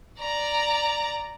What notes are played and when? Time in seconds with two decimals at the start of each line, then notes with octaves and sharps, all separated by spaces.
0.20 D5 A#5